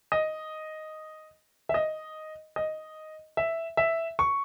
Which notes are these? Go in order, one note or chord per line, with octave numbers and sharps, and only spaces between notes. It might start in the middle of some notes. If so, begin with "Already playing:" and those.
D#5
E5
D#5
D#5
E5
E5
C#6